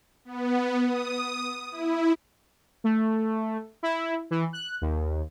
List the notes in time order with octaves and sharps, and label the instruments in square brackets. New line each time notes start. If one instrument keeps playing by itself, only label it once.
[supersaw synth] B3
D#6
E4
[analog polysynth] A3
E4
E3
F#6
D#2